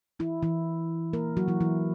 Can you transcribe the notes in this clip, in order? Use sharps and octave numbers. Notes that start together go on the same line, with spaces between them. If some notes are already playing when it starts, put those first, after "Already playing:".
E3 E4
E3 E4
A#3 A#4
F#3 F#4
E3 E4
E3 E4